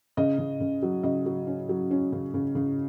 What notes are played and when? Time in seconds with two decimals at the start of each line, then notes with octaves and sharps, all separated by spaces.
0.17 C#3 D#5
0.38 C#3
0.60 C#3
0.82 F#3
1.03 C#3 D#5
1.26 F#3
1.47 C#4
1.69 F#3
1.91 C#4
2.12 C#3
2.34 C#3
2.55 C#3